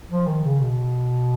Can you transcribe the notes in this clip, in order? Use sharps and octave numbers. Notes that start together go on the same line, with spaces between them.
F3
D#3
C#3
B2